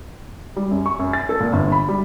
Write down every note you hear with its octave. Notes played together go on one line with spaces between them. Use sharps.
G3
F#2
C#6
F#2
A6
A4
A#2
G1
B5
G3